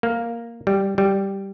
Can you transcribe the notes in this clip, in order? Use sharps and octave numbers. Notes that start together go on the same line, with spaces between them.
A#3
G3
G3